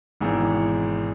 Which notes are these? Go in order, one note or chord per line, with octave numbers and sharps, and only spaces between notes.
G#1 G#2 B2 E3